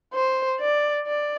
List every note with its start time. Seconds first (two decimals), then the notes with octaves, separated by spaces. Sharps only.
0.14 C5
0.60 D5
1.07 D5